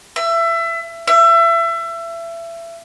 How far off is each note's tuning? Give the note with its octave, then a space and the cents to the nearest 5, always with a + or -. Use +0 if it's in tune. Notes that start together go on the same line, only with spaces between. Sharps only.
E5 +25
E5 +30